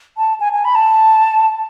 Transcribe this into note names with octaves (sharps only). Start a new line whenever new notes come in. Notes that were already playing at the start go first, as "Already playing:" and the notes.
A5
G#5
G#5
B5
A5